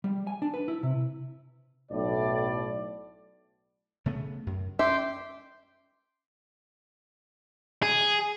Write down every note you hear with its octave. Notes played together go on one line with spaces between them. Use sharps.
G3
G#5
D4
B4
E4
C3
B1 A2 D5
C#3 A3 B3
F#2
C#4 E5 G5 C6 D6
G#4